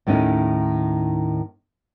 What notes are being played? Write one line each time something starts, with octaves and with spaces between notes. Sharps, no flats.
D#2 A2 D#3 C#4 D#4